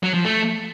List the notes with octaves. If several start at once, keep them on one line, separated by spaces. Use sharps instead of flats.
F#3
F3
A3